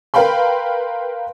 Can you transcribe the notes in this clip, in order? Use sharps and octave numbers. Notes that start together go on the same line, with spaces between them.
A#4 B4 F5 G5 B5 C6